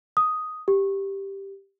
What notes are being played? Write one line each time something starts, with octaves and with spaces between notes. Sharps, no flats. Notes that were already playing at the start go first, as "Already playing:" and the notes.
D#6
G4